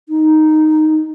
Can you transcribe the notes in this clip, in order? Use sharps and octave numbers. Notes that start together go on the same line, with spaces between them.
D#4